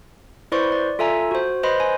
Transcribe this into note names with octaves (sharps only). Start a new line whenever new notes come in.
E4 B4 C5 D5 C6 C#6
D5
F4 A4 E5 G#5 A#5
F#4 C5
B4 C5 D#5 B5 C6
G#5